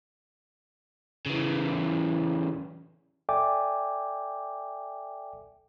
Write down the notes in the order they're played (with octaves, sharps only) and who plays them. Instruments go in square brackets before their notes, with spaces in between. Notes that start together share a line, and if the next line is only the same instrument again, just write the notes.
[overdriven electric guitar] C#3 E3
[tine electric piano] A4 D5 E5 G5 G#5 D6